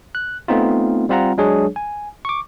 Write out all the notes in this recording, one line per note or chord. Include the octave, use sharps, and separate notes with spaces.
F#6
A3 B3 C4 D#4 F4
G3 C4 F4 F#5 A#5
F#3 G#3 D4 G#4 C#5
G#5
C#6 D6